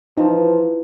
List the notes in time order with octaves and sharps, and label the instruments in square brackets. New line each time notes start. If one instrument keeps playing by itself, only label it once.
[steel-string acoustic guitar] E3 [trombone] F3 [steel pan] D#4